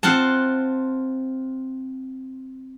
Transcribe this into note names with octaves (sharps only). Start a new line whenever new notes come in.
C4 F4 F#5 A5